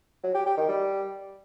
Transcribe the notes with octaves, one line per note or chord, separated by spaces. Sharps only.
F#3
G4
G4
D#3
G3